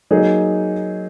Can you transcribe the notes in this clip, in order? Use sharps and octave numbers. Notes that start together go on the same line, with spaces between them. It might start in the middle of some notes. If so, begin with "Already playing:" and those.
F#3 A#3 D#4 G#4